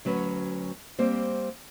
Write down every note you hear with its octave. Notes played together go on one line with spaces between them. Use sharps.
D2 F#3 C#4 B4
G3 A#3 C4 C5